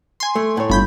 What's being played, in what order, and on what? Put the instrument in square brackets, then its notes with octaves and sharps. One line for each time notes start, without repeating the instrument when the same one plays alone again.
[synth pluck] G#5 C6
[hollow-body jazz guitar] A3
A2 C#5
[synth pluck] G1 B5 G6